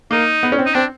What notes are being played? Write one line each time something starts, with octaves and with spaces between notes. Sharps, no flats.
A#3 D#4
B3
C#4
C4
D#4
C4 D4